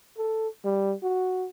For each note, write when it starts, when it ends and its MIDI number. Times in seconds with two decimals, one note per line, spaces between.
0.18 0.48 69
0.64 0.93 55
1.03 1.47 66